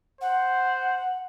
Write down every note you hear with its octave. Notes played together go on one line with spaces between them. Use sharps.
C5 F#5